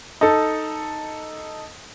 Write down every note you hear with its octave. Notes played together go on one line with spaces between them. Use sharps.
D#4 A4